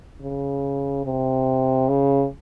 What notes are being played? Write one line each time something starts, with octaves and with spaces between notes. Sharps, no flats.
C#3
C3
C#3